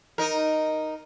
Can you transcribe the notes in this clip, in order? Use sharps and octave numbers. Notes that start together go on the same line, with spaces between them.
D#4 A#4